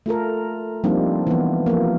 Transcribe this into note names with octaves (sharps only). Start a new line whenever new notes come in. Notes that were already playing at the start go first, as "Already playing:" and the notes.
A3 F4 A4 A#4
F3 G3 A#3 C4 D4 D#4
E3 B3
F3 A#3